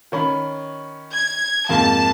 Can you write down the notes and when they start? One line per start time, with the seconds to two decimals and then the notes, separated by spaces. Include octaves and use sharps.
0.12 D#3 C#4 B5
1.13 G#6
1.69 F2 G#2 A#3 A5